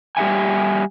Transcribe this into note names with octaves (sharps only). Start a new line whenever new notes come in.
G3 G4 C5 E5 F#5 G#5